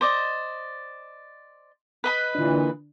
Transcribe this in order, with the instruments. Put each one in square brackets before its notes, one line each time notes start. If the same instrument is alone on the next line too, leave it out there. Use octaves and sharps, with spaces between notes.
[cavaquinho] C5 D5 D#5
[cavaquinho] B4 D#5 B5 [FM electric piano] F#6
[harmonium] A#2 E3 [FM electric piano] D3 D4